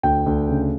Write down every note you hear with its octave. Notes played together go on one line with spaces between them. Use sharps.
D2 G5
D2
C#3